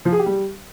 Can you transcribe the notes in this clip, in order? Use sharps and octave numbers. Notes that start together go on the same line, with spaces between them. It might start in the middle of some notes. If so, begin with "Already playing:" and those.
F3
G#4
G4
G3